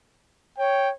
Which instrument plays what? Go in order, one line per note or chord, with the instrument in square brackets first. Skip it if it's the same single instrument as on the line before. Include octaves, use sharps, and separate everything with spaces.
[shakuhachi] C#5 [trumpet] G5